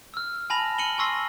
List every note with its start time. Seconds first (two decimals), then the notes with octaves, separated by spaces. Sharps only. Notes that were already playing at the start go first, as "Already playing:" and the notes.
0.14 E6 F6
0.50 G#5 A5 B5 A#6 F7
0.78 F6 C#7 D#7 F#7 G7
0.98 G#5 C6 C#6 E6 A#6 C7